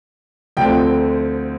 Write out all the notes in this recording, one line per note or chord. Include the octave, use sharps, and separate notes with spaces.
D2 D3 F3 A3 C4 G5